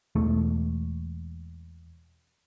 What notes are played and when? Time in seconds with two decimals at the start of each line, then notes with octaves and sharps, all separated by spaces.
0.15 E1 E2 A3